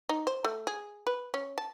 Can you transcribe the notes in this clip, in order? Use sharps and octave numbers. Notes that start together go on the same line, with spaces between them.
D#4
C5
A3
G#4
B4
C#4
A5